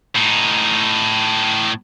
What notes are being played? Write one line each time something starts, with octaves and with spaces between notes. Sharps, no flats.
A2 D#4